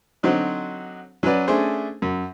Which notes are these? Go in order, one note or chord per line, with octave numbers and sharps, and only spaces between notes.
D3 F#3 C4 D#4 F#4 C5
F#3 C#4 F#4 B4 D5
A3 C#4 D4 G#4 C5
F#2